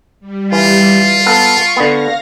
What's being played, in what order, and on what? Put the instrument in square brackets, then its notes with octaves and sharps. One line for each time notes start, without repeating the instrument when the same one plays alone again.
[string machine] G3
[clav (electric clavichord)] E3 [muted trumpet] F4
[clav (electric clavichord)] B3 A4 F5 [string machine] C#6
[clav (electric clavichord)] D3 B3 [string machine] F5 A#6